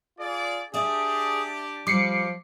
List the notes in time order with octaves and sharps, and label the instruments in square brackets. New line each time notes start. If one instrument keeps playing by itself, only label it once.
[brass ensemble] F4 G#4 D5
[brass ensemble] D4 G4 [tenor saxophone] G#4 [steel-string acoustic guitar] D5 E5
[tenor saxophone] F3 [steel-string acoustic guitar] G3 [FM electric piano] D6 C7 C#7